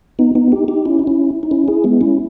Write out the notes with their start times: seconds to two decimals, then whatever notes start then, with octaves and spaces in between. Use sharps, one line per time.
0.19 B3 D#4
0.35 B3 D#4
0.52 D#4 G4
0.68 D#4 G4
0.85 C#4 E4
0.99 D#4
1.07 C#4 E4
1.43 D#4
1.51 C#4 E4
1.68 E4 G#4
1.84 G#3 B3
2.01 C#4 E4